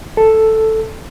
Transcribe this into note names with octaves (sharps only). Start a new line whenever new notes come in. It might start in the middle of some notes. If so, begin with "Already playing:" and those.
A4